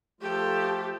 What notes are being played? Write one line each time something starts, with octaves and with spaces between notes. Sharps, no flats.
F3 A3 F4 G4 A4